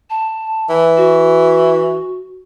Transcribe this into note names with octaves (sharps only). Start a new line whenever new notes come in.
A5
E3
F#4